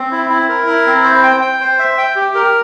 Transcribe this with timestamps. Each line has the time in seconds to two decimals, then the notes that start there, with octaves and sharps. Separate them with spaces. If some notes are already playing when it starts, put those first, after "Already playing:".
Already playing: C4
0.12 E4
0.29 E4
0.49 A#4
0.67 E4
0.86 C4
1.04 C5
1.23 G5
1.41 G5
1.60 C5
1.79 E5
1.98 G5
2.16 G4
2.35 A#4